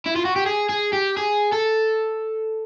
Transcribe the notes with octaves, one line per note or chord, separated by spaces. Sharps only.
E4
F4
F#4
G4
G#4
G#4
G4
G#4
A4